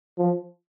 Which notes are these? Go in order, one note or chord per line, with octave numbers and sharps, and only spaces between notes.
F3